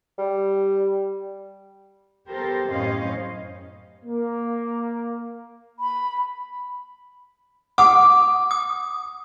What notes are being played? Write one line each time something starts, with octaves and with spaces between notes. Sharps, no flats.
G3
B3 G4 A4 A#4 C5
F#2 A2 C#4 C5 D#5 F5
A#3
B5
F#5 D6 D#6
D#6